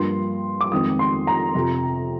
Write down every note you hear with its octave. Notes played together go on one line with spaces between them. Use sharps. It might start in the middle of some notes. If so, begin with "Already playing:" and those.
Already playing: G2 F3 A#3 C6
D6
F2 D#3 G#3 C4 D#6
C6
A#5
F2 C3 F3